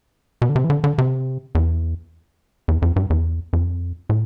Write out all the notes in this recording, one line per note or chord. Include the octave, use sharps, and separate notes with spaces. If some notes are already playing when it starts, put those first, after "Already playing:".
B2
D3
C3
E3
D3
D3
C3
E2
E2
F2
G2
E2
F2
A2